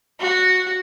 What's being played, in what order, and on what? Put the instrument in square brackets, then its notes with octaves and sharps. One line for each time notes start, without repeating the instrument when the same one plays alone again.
[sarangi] F#4